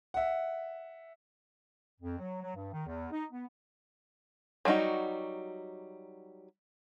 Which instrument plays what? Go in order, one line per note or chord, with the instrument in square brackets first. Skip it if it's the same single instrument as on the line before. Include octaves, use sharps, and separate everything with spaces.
[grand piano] E5 F#5
[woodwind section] F2
F#3
F#3
G2
D#3
E2
D#4
B3
[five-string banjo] F#3 G3 C4 D#4 F#4